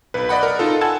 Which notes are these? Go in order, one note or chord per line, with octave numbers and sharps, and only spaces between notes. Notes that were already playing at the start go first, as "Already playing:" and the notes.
B1 B4
D5 D#5 F#5 B5
A#4
D#4 F4 A4
F#5 G#5 A5 E6 G#6